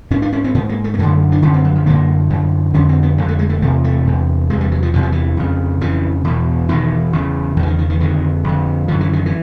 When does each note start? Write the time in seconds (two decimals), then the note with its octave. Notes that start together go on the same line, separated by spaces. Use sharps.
0.11 G#2 C#4
0.22 D4
0.33 C#4
0.44 C4
0.54 G#2 B3
0.69 A#3
0.84 A3
0.94 A#3
0.99 F#2 D3 A3
1.32 D4
1.42 F#2 D3 C#4
1.54 C4
1.65 F#3
1.75 F3
1.86 F#2 D3 A#3
2.30 F#2 D3
2.74 F2 D3 C#4
2.89 C4
3.03 B3
3.18 F2 D3 A#3
3.28 A3
3.39 G#3
3.49 A3
3.62 E2 C3 A3
3.84 A3
4.05 E2 C3
4.50 E2 C3 G#3
4.61 G3
4.72 F#3
4.82 F3
4.93 E2 C3 E3
5.03 F3
5.12 E3
5.37 F2 C#3
5.81 F2 C#3 E3
6.24 E2 B2
6.68 E2 B2 D#3
7.13 E2 C#3
7.57 E2 D3
7.60 C#3 E3
7.67 D#3
7.79 D#3
7.90 D#3
8.00 F2 D3 D#3
8.44 F2 D3
8.88 F#2 D3 F3
9.01 E3
9.13 D#3
9.26 E3